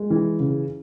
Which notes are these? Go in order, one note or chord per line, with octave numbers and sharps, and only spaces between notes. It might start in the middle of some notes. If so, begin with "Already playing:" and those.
Already playing: G#3
E3
C#3